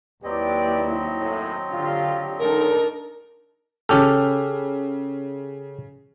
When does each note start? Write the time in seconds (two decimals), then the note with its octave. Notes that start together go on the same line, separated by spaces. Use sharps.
0.24 D#2 F#3 C4 E4 G4 B4 D5 D#5
1.20 F#2 A2
1.71 D3 F4 G4
2.39 E2 C#3 G#3 D4 D#4 A4 A#4
3.89 C#3 C#4 G4 A4 F6